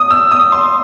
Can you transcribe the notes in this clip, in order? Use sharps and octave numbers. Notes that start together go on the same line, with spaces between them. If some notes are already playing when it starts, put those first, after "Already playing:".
Already playing: D#6
E6
D#6
C6